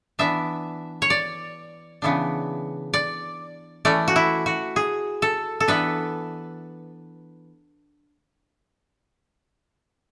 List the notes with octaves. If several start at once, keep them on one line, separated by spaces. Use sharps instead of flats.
E3 B3 D4 E5
C#5
D5
C#3 E3 B3 D4
D5
E3 A3 C#4 D5
F#4
E4
F#4
G#4
A4
A4
E3 B3 D4 B4